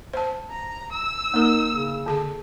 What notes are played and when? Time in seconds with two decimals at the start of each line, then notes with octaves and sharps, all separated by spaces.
0.13 C5 A5
0.50 A#5
0.93 E6
1.34 A#3 D#4 A#4
1.72 C#3
2.06 D3 G#4 A5